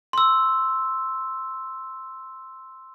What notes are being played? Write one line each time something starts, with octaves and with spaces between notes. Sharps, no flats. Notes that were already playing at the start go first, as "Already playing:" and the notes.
C6 E6